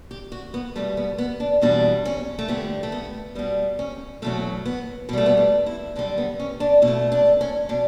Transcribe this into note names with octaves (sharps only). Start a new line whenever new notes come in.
G4
F#4
B3
B2 G3 A3
B3
B3
D4
E2 B2 G3 D4
C#4
A3
D2 D3 G3 B3
A3
B3
B2 G3 B3
C#4
E2 B2 F#3 A3
B3
B2 G3 A3 B3
B3
D4
E4
F#2 D3 G3 D4
B3
C#4
D4
B2 E4
A3
D4
C#4
B2 D4